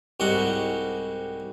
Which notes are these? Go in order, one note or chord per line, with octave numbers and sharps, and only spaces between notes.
C2 G#2 G3 F#4 F#5